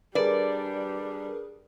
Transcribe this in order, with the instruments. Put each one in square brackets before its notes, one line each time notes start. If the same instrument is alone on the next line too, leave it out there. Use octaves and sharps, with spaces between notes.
[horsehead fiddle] G3 D4 [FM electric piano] G#4 A#4 B4 [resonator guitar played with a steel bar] D5